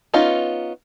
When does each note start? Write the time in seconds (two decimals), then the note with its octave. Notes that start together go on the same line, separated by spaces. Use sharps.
0.14 B3 C#4 D#4 F4